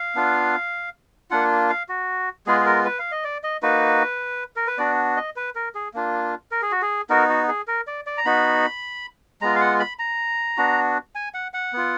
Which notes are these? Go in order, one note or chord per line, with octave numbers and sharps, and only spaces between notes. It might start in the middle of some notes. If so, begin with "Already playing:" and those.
Already playing: F5
B3 D4 F4
A#3 D4 F4 F#5
F5
F#4
G#3 B3 F4 G#4
G#4
A#4
B4
F5
D#5
D5
D#5
A#3 D#4 F#4 B4
A#4
B4
B3 D4 F#4 D5
D#5
B4
A#4
G#4
A#3 D4 F4
A#4
G#4
F#4
G#4
B3 D#4 F#4 A#4
F#4
G#4
A#4
D5
D5
A#5
B3 D#4 F#4 B5
G#3 B3 F4 A#5
F5
F#5
B5
A#5
B3 D4 F#4
G#5
F#5
F#5
B3 F4